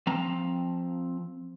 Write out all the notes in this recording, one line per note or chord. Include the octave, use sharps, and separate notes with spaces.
F3 C4 A#5